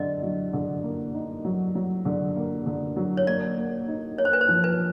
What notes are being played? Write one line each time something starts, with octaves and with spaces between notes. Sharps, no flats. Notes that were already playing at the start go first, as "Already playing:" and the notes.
Already playing: D3 F#3 D#5
F#3
D3
A#3
D#4
F#3
F#3
D3
A#3
D3
F#3
C#5
A#3 D5
A#3
D#4
A#3 C#5
C5
B4
C5
F3
B4